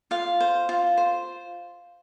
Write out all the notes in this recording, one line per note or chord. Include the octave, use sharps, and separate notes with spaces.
F4 F5
C5
F4
C5